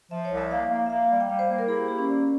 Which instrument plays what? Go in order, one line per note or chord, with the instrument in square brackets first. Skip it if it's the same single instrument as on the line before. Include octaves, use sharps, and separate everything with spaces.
[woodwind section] F3 [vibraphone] E5
[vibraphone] C#5
[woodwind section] C2
[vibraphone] E5
[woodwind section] A#3 [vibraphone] F5
[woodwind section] A#3
[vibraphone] E5
[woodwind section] A#3 [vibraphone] F5
[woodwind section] G3
[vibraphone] G5
[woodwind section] G3 [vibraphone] F5
[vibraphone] C5
[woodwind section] A#3
[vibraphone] A#4
[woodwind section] E4 [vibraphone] G#4
[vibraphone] G4
[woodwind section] A#3 [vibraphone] G4
[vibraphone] C#4
[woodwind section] G3